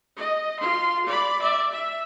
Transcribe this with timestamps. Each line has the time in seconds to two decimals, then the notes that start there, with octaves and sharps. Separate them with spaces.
0.16 D#5
0.59 F4 C6
1.06 D5 B5
1.41 D5 E5
1.72 E5